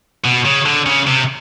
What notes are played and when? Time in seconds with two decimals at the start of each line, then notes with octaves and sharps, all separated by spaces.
0.24 B2
0.45 C#3
0.66 D3
0.86 C#3
1.07 C3